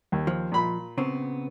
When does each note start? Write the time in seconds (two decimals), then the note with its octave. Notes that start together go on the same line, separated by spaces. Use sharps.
0.12 D#2
0.27 F3
0.52 A#2 B5
0.98 C#3 B3 C4